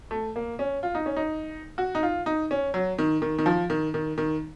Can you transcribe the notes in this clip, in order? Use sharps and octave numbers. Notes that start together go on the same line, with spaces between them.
A3
A#3
C#4
F4
D#4
C#4
D#4
F#4
D#4
F4
D#4
C#4
F#3
D#3
D#3
D#3
F3
D#3
D#3
D#3